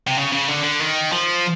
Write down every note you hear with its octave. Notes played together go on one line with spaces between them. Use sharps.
C3
C#3
C#3
D3
D3
D#3
F3